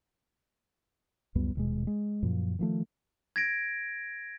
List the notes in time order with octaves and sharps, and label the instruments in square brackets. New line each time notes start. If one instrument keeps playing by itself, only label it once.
[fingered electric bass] C#2 F#2 G3 B3
D#1 B2 G#3
G#3
F#2 A#2 F3
D#3 F3 A3
[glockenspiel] G#6 A#6 D7